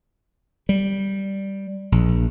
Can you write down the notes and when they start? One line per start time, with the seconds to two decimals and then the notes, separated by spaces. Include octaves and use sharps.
0.69 G3
1.92 A#1